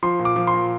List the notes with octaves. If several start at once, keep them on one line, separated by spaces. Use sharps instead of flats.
F3 C6
A#2
D6
F3
C6
A#2